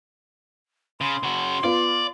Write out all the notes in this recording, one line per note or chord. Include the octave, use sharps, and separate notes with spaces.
C#3 C6
C#3 F#4
B3 F4 D5